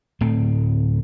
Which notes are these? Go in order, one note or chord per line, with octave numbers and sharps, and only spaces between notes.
D1 A2 A3 C4